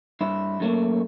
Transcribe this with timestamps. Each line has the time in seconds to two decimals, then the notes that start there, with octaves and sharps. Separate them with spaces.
0.21 G2 E4
0.60 F#2 A3 A#3